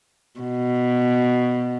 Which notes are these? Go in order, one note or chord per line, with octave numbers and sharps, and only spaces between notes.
B2